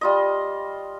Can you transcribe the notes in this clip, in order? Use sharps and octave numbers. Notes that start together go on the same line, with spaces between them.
G3 F4 D#5